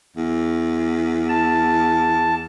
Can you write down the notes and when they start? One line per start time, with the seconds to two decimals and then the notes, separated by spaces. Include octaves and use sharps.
0.16 E2
1.29 A5